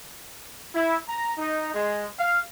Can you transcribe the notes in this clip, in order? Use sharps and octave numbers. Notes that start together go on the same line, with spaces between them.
E4
A#5
D#4
G#3
F5